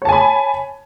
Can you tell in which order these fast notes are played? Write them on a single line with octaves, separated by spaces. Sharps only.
C#5 A5 G#5 B5